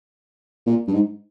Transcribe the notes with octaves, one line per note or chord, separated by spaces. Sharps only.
A#2
G2
G#2